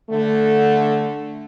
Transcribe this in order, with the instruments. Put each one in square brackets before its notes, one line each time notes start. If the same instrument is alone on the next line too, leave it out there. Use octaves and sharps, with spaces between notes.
[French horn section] D3 A3